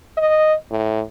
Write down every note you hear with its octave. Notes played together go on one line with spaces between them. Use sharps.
D#5
A2